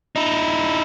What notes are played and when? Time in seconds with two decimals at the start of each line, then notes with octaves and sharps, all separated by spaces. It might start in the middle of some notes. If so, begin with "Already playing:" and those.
0.16 D#4 E4